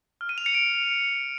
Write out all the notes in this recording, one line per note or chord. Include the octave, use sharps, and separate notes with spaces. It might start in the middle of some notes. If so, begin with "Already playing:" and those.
F6
D#7
F7
C#7
D7